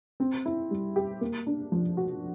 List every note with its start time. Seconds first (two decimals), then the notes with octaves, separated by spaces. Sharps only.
0.20 C4
0.45 E4
0.71 G3
0.96 G4
1.21 A#3
1.46 D4
1.72 F3
1.97 F#4